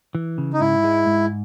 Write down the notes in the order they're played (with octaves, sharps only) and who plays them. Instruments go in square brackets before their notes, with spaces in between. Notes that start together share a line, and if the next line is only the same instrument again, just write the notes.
[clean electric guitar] E3
C#3
[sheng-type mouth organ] D#4
[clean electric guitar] G#2 [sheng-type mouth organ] E4
[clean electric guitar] G#3
G#2